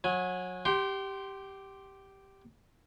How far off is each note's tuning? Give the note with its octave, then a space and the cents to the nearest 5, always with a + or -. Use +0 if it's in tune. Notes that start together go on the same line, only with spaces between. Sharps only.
F#3 -25 G#5 +0
G4 +0 G5 -35 C6 +0